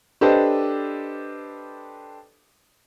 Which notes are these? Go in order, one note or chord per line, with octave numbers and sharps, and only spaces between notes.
D4 G4 A4 B4 C5 D#5